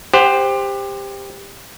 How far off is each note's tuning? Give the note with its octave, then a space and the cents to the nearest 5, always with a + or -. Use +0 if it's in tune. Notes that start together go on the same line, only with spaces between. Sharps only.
G4 +20 C5 +0 F#5 +0